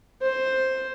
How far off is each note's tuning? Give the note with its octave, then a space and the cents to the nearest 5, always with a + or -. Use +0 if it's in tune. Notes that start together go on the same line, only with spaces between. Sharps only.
C5 +5